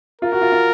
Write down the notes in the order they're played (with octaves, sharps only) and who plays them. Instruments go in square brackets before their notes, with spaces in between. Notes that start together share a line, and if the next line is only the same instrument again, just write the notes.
[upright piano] F4 [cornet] A#4
[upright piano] F#4
F4
F4